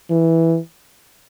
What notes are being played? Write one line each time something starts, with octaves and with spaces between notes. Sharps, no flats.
E3